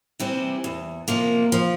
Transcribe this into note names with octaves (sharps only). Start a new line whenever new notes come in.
C3 E3 G3 C4
E2
C3 F3 A#3
F3